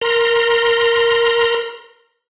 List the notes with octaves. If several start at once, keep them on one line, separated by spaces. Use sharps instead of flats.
A#4 A#5 C6